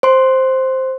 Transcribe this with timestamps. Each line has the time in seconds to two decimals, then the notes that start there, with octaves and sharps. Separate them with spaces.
0.03 C5 C6